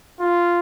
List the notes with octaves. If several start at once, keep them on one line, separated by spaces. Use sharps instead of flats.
F4